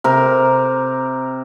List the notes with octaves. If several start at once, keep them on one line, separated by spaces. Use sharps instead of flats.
C3 A#4